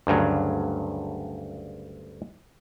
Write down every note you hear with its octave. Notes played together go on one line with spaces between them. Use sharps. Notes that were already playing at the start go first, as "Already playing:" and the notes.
D2 G2 C#3 F#3